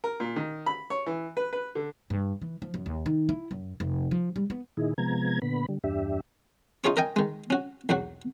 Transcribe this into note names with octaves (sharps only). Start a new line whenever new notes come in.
A#4
A#2
D#3
B5
C#5
E3
B4
B4
D3
G2
E3
F3
F#2
D#2
D#3
E4
F#2
F1
F3
G3
B3
A#2 D#3 D#4 E4 G#4
C3 F3 G#3 B3 A#5 G#6
A#2 D3 B3 B5
D3 G3
E2 G2 D4 G4 E5
D#4 F4 G#4 C#5 C#6
A#4 D#5 G5 G#5
D#3 G#3
C#4 F#4
B1 E2 F#3 F#4